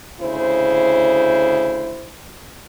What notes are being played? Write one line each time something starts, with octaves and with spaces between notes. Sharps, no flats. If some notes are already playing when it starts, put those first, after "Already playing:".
D2 C#3 E4 C5